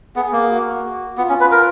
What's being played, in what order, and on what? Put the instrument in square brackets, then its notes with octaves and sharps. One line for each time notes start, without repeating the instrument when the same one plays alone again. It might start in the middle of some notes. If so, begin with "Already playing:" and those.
[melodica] B3 [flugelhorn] G#4
[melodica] A#3
[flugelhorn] F#4
[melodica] B3 [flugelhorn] F4
[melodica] C#4
B4
A#4